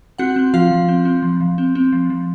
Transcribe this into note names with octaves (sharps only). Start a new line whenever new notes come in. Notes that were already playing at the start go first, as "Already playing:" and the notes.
C4 F#4 F#5
C4
F3 F4 F5
F3
C4
C4
F3
F3
C4
C4
F3
F3